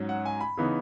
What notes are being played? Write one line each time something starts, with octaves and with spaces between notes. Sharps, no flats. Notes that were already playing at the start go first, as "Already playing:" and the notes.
Already playing: G#2 F#3 C#4
F#5
G#5
B5
C#3 E3 B3 D#4